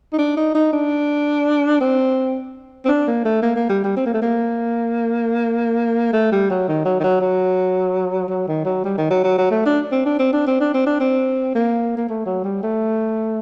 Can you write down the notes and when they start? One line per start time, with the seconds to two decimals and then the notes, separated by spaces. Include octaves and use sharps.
0.13 D#4
0.18 D4
0.37 D#4
0.55 D#4
0.73 D4
1.81 C4
2.85 C4
2.88 D4
3.07 A#3
3.25 A3
3.43 A#3
3.56 A#3
3.69 G3
3.84 G3
3.97 C4
4.06 A#3
4.14 A3
4.22 A#3
6.13 A3
6.32 G3
6.50 F#3
6.68 D#3
6.85 F#3
6.99 D#3
7.04 F#3
7.21 F#3
8.29 F#3
8.48 D#3
8.65 F#3
8.85 G3
8.98 D#3
9.10 F#3
9.24 F#3
9.38 F#3
9.51 A3
9.66 D4
9.92 C4
10.06 D4
10.19 C4
10.33 D4
10.47 C4
10.60 D4
10.74 C4
10.86 D4
11.00 C4
11.55 A#3
11.97 A#3
12.09 A3
12.26 F#3
12.44 G3
12.63 A3